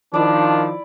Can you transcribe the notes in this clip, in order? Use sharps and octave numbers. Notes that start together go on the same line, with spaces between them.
D#3 F3 D4 E4 D5